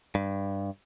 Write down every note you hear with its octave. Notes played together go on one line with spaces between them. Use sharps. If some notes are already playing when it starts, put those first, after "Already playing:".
G2